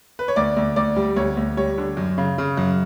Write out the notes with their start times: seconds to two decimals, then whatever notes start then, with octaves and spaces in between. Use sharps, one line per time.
0.19 B4
0.28 C#5
0.36 D2 D5
0.57 D2
0.76 D2 D5
0.96 G3
1.16 D2 C#5
1.37 D2
1.57 G3 C#5
1.78 D3
1.97 F#2
2.18 C#3
2.38 C#3
2.57 F#2